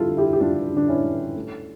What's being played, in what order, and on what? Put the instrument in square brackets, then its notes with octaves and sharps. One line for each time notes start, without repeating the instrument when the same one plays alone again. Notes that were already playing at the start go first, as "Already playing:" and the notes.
Already playing: [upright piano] D3 G3 E4 F4 A4
D3
E4 G4
G4
G3 D4 F4
D3 D4
C#4 E4
G3
A3